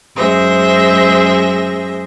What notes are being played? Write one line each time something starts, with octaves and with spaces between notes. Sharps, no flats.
F#2 G#3 G#4 C5 E5 A#6